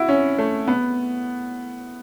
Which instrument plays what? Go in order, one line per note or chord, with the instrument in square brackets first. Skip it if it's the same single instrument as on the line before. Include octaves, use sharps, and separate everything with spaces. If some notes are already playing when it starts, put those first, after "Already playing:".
Already playing: [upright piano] E4 F#4
C#4
A3
B3